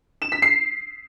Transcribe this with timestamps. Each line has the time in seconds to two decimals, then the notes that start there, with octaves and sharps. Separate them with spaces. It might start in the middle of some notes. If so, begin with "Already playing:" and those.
0.22 E7
0.32 B6
0.42 C7